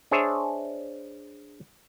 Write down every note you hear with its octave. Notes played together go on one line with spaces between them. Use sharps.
D4 G#4 C5 C#5 E5